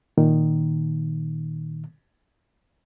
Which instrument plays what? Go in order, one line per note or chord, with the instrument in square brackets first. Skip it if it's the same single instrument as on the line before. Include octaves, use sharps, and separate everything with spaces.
[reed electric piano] A#2 D#3